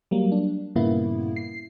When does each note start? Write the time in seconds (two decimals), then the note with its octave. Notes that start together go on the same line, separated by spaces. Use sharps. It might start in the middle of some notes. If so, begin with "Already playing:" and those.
0.11 F#3 G3 A#3
0.32 D4
0.75 G2 A#2 C#3 A#3 B3 E4
1.36 C7